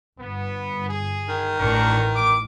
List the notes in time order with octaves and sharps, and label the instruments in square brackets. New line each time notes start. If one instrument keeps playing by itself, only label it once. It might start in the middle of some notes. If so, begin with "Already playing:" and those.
[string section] G1 [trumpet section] B3
[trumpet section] G#4
[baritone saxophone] D#3
[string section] A1 [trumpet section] D4 A#4 C#6
[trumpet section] D6